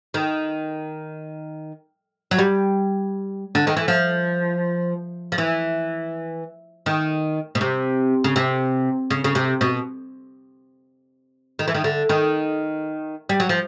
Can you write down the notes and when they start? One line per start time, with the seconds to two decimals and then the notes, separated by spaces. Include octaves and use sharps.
0.14 D#3
2.31 F#3
2.39 G3
3.55 D3
3.67 D#3
3.77 E3
3.88 F3
5.32 F3
5.38 E3
6.86 D#3
7.55 B2
7.61 C3
8.24 C#3
8.36 C3
9.10 C#3
9.24 C#3
9.35 C3
9.61 B2
11.59 D#3
11.68 E3
11.75 D#3
11.84 D3
12.09 D#3
13.29 G3
13.40 F#3
13.49 F3